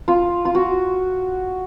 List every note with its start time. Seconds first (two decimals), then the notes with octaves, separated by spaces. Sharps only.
0.08 F4
0.45 F4
0.55 F#4